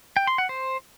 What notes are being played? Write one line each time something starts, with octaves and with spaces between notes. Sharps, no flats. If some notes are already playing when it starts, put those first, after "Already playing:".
G5
C6
F#5
C5